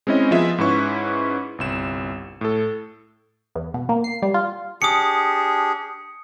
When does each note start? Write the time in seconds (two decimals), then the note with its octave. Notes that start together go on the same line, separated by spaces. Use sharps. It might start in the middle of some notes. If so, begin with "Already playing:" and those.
0.07 G#3 C4 C#4 E4 D#5
0.31 F3 B3 F4 G#4 D#5 E5
0.58 G#2 C#4 E4 B4 C#6
1.58 G1 C2 E7
2.41 A2 A4
3.55 E2
3.74 B2
3.89 A#3
4.04 C7
4.22 G3
4.34 F4
4.82 D4 G4 G#4 D#6 C#7